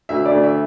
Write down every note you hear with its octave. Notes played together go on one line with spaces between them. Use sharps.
D2 E5
D5
D2
E5